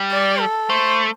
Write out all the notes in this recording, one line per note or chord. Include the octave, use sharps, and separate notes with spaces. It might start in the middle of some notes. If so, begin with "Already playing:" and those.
Already playing: G3
D5
A4
A3 C5